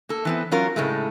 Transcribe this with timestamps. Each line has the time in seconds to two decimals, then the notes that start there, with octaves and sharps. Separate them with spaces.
0.09 A#3 A4
0.25 E3 B3 C4
0.51 F#3 C#4 F4 A#4
0.76 A2 C#3 G#3 A3